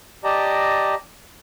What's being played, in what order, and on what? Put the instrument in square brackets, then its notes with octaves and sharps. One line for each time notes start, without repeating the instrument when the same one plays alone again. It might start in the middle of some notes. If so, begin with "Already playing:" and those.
[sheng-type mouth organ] G4 D5 D#5 A5 A#5